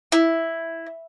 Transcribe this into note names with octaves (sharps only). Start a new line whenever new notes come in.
E4